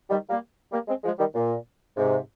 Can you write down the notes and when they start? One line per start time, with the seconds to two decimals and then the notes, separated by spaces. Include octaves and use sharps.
0.09 D#3 G3
0.30 G3 A#3
0.72 G3 A#3
0.88 G#3 C4
1.04 F3 G#3
1.19 D#3 G3
1.35 A#2
1.97 G#2 C3